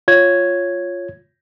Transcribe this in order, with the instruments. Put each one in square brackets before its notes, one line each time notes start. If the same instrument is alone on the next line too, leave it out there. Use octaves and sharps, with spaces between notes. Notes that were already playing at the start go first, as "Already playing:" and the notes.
[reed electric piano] F4 C#5 G#6